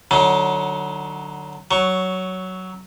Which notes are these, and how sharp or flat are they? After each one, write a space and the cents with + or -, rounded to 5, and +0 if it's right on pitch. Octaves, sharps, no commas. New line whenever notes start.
D3 +25 F#3 +0 D#4 +45
F#3 +10 C#6 +0